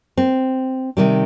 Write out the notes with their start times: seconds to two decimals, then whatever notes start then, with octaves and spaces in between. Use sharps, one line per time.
0.17 C4
0.97 C3 D#3 G3